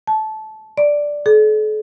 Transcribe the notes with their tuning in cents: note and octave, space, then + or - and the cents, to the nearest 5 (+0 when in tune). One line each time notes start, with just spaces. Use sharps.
A5 -20
D5 +0
A4 -45